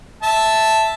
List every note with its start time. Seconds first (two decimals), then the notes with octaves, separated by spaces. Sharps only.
0.23 E5 A5